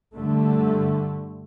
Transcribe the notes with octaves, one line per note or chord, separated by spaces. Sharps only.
G2 D3 A3